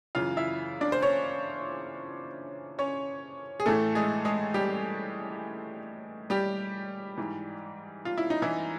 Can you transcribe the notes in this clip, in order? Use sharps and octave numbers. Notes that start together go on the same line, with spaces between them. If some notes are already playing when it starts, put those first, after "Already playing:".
F#2 C#3 E3 F4 F5
E4 E5
D4 D5
C5
C#4 C#5
C#4 C#5
G#4
A2 E3 A3 A4
G#3 G#4
G#3 G#4
G3 G4
G3 G4
G#2 E3
F4
E4
D#4
E3 E4